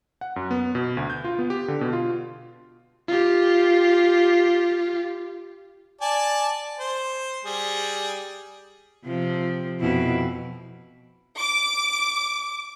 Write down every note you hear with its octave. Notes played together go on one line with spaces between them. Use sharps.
F#5
F#2
B3
B2
D2
G6
F4
B3
G4
D3
B2
F4
F4 G4
D5 G#5 A5
C5
G3 G#4
C3 F3
F2 B2 E4
D6